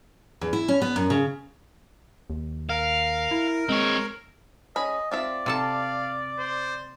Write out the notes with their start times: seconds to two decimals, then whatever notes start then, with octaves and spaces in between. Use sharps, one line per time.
0.41 E2
0.53 E4
0.68 C#4
0.82 B3
0.96 F#2
1.10 C#3
2.30 D#2
2.69 A#4 F5
3.31 E4
3.69 G#3 C4 C#5
4.76 C#4 G#4 D#5 B5
5.11 C4 F4 D5 E5
5.46 C3 A4 F5 A5
6.39 C5